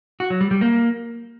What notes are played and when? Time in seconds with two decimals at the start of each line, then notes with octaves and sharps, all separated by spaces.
0.20 F#4
0.30 F#3
0.41 G3
0.51 G3
0.61 A#3